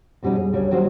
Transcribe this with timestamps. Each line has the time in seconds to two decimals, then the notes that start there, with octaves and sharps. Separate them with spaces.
0.23 F2 B2 G3 C4 C#4 D#4
0.35 G#4
0.52 D2 C#3 G3 C#5
0.71 D#3 F#3 G3 C#4 F#4 C5